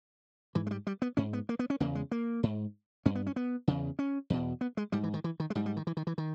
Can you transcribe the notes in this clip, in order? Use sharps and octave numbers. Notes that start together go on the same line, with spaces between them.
G#2 E3
G#3
G3
G3
B3
G#2 C#4
B3
A#3
B3
C#4
E2 C#3 A#3
G#3
A#3
G#2
G2 C#4
B3
C#4
B3
E2 C#3
C#4
E2 B2
B3
G#3
G#2 G3
E3
D#3
E3
D#3
G#3
G#2 G3
G3
D#3
E3
D#3
E3
D#3